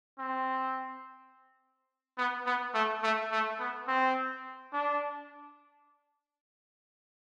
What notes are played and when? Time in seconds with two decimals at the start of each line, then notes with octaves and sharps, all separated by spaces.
0.19 C4
2.18 B3
2.46 B3
2.74 A3
3.03 A3
3.32 A3
3.60 B3
3.88 C4
4.73 D4